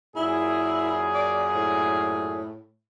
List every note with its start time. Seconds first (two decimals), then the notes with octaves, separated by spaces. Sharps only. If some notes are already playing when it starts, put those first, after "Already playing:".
0.16 F#2 A#2 E4 G#4
1.14 D5
1.55 A2